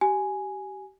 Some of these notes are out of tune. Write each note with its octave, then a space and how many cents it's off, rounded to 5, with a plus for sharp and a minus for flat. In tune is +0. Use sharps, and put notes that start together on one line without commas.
G4 -30 G#5 +0